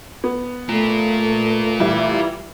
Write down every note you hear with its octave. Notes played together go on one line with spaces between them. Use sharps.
B3
A3 F4 A#4
E3 G3 E4